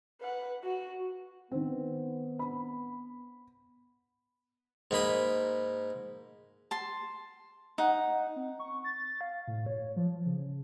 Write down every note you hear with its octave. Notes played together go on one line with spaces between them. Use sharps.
B4 F#5
F#4
D#3 B3 C4
B5
G#2 A#3 B5 D#6
A5 C6
D#4 F#5
C4
C#6
A6
F5
A2
C#5
F3
C#3